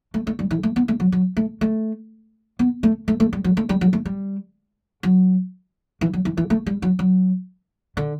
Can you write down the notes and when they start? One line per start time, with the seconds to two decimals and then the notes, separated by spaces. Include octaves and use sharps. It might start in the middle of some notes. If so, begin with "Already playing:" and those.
0.14 A3
0.27 A3
0.39 G3
0.51 E3
0.63 A3
0.76 B3
0.88 A3
1.00 F#3
1.12 F#3
1.37 A3
1.61 A3
2.59 B3
2.83 A3
3.08 A3
3.20 A3
3.33 G3
3.44 F#3
3.57 A3
3.69 G3
3.81 F#3
3.93 A3
4.05 G3
5.03 F#3
6.01 E3
6.13 F#3
6.25 E3
6.37 E3
6.50 A3
6.66 G3
6.82 F#3
6.99 F#3
7.97 D3